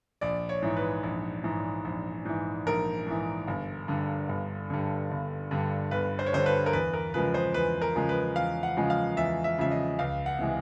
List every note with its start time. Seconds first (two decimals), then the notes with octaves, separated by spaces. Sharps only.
0.21 A#1 D5
0.49 C#5
0.62 G#2 E3
0.77 B4
1.03 A#1
1.44 G#2 E3
1.85 A#1
2.25 G#2 E3
2.67 A#1 A#4
3.07 G#2 E3
3.48 G1
3.88 G2 D3
4.29 G1
4.70 G2 D3
5.11 G1
5.51 G2 D3
5.91 G1 B4
6.19 C5
6.26 C#5
6.33 G2 D3 C5
6.46 B4
6.66 A#4
6.73 E2 B4
6.94 A#4
7.14 C#3 F3 G#3 B4
7.34 C5
7.54 E2 B4
7.81 A#4
7.95 C#3 F3 G#3
8.09 B4
8.36 E2 F5
8.63 F#5
8.77 C#3 F3 G#3
8.90 F5
9.17 E2 E5
9.44 E5
9.58 C#3 F3 G#3 E5
9.71 D#5
9.99 C#2 F5
10.26 F#5
10.39 C3 E3 G#3